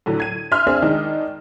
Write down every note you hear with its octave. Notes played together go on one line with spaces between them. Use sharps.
A2 D3 F#3
G#6 D#7
E5 C6 F6
C4 D4 G#4 D5 E5
D#3 G#3 D4 D#4